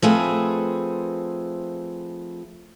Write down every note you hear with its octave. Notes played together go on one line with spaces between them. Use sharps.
F3 A3 C4 G#4 B4